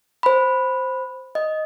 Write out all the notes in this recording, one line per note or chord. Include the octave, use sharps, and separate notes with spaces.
C5 B5
D#5